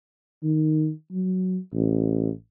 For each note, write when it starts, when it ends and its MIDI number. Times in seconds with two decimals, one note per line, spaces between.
0.43 0.90 51
1.12 1.58 54
1.74 2.30 33